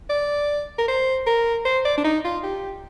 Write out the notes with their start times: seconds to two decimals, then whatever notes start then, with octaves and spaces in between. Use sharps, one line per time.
0.10 D5
0.79 A#4
0.88 C5
1.27 A#4
1.65 C5
1.85 D5
1.98 D4
2.05 D#4
2.25 F4
2.44 G4